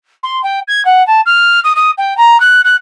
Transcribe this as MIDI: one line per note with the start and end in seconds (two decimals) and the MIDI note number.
0.23 0.41 84
0.43 0.60 79
0.68 0.83 92
0.85 1.05 78
1.07 1.21 81
1.26 1.60 89
1.64 1.73 87
1.76 1.91 87
1.98 2.16 79
2.17 2.40 82
2.40 2.61 90
2.65 2.76 90